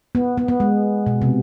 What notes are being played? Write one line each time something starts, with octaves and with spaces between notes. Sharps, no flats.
B3
B3
B3
G#3
B2
C3